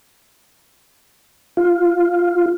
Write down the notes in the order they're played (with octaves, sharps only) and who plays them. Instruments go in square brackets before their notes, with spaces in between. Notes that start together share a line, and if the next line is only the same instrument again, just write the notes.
[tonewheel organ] F4